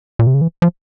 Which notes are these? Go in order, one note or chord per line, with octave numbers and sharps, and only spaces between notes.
A#2
C3
C#3
E3
F3